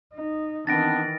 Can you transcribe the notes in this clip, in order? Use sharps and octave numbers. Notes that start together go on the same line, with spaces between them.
D#4
D#3 E3 B3 C4 D4 A6 A#6 D7